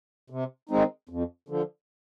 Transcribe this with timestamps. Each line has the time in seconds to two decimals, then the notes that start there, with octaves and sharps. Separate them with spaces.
0.30 C3
0.69 D#3 G#3 C4 D#4
1.09 F2
1.49 D3 F3